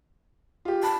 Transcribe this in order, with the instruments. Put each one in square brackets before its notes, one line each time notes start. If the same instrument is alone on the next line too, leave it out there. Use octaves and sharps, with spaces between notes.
[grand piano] F4 G4
[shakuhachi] A5 [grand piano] B5